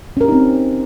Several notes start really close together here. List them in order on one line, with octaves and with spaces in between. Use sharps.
C#4 A#4 G4 D#4 C4